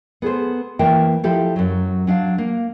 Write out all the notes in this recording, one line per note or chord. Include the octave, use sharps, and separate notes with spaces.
B3 G#4 A4 C5
E3 A#3 E5 G5 A5
F3 E4 G4 A4
F#2 F#3
F#3 D4 E5 F5
A#3